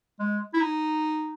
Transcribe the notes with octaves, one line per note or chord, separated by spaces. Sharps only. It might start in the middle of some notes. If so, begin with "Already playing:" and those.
G#3
E4
D#4